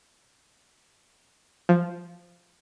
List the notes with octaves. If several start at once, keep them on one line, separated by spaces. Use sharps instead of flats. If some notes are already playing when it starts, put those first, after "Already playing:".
F3